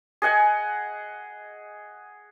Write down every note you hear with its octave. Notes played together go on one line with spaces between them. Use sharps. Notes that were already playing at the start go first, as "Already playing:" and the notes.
G#4 D#5 F#5 G#5